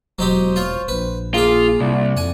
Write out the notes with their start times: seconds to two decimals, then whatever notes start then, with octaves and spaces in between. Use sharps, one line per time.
0.19 E1 F#3 D#4 G4 C5
0.56 F4 C#5
0.88 A#1 B4
1.34 A#3 F4 G#4 G5
1.80 C2 D5
2.17 F2 F#5 G#5